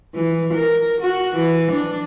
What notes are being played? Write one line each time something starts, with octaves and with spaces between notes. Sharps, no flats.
E3
A#4
F#4
E3
D4